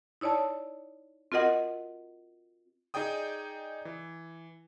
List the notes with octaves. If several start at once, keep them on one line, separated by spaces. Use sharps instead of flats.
D#4 E4 C#5 D5 A5
C4 F4 F#4 A#4 D#5 F#5
D#4 G#4 D5 G5 D#6
E3